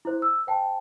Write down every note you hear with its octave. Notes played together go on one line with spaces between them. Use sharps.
E4 C5
E6
C5 G5 A5